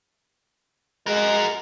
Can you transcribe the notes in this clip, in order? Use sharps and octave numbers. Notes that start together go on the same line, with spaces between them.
G#3 F#4 A#4